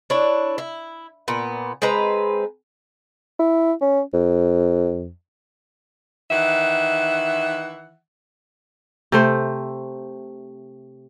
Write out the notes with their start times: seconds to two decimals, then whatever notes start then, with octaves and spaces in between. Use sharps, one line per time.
0.10 D4 E4 C#5
0.58 E4
1.28 A#2 B3
1.82 G#3 C4 B4 A#5
3.39 E4
3.81 C#4
4.14 F2
6.31 D#3 E3 E5 F#5
9.12 C3 A3 C5